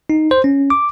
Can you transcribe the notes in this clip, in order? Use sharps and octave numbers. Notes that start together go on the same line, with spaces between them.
D#4
C5
C#4
D6